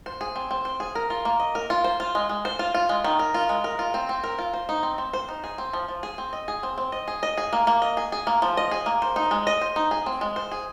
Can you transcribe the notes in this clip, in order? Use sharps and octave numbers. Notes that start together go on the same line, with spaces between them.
C5
G#4
C4
C4
C5
G#4
A#4
F4
A#3
D#5
A#4
F4
C5
F4
G#3
G#3
C5
F4
F4
G#3
D#3
A#4
F4
G#3
A#4
F4
C4
C4
A#4
F4
C5
D#4
C4
C4
C5
D#4
G#4
C4
F3
F3
G#4
C4
D#5
G#4
C4
C4
D#5
G#4
D#5
G#4
A#3
A#3
D#5
G#4
G#4
A#3
F3
D#5
G#4
A#3
C5
D#4
G#3
D#5
C5
D#4
G#4
C4
G#3
C5
G#4